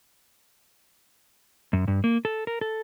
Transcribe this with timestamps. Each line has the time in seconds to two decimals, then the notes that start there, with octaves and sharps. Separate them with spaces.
1.73 F#2
1.88 G2
2.04 A#3
2.25 A4
2.47 A#4
2.61 A4